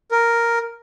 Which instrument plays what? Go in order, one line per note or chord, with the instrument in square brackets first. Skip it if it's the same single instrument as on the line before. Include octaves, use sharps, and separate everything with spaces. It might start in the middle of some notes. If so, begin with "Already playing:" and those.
[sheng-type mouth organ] A#4